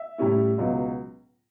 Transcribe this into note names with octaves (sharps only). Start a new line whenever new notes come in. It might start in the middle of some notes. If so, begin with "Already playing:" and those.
Already playing: E5
A2 G3 C#4 E4
C#2 B2 F#3